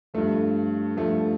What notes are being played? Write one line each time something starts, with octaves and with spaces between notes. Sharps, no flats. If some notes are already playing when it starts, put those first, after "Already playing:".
G2 F3 A3
G2 F3 A3